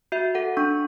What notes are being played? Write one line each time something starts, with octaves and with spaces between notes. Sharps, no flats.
F#4 E5
A4 F#5
D4 C#6